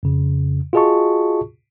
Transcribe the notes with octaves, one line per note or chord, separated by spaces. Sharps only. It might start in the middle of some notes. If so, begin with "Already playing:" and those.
F2 C#3
F4 F#4 G#4 D#5 A5 C#6